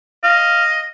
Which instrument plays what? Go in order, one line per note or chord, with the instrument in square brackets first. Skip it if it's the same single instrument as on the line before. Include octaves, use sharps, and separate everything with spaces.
[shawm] D#5 [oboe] F5